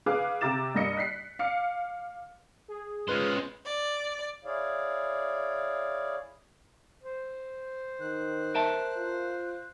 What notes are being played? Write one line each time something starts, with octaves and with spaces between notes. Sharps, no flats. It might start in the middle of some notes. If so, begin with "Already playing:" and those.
G#4 B4 F5 D6 F#6
C3 A#5 D6 A6 E7
G2 A#3 D#5 C#7
F#6 B6 C7
F5 D6 C#7
G#4
G#3 C#4 F4 B4 C5
D5
E4 G#4 C#5 D5 F5
C5
D#3 F#6
A#4 E5 A5
F4